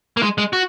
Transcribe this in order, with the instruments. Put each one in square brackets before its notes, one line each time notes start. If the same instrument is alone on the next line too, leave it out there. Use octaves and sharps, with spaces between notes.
[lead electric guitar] A#3
G#3
G#3
F#4